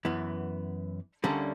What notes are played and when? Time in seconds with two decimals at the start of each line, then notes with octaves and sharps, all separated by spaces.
0.05 F#2 E3 B3
1.24 D2 D3 G3 A#3 C#4